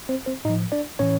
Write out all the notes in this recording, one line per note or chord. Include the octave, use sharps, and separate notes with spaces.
C4 C5
C4 C5
A2 F3 D#4 D#5
D4 D5
A2 E3 C#4 C#5